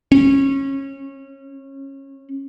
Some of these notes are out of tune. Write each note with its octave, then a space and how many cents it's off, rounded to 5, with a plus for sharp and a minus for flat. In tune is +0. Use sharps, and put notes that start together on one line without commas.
C#4 -25